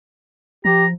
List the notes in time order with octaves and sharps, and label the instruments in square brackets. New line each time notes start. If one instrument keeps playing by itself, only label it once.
[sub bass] F3 [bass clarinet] G4 [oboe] A#5